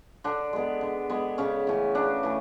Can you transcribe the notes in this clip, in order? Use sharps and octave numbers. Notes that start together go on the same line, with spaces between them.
D3 D4
G#3 B3
D3
G#3 B3
C#3 C#4
E3 A3 C#4
C#3 D4
E3 A3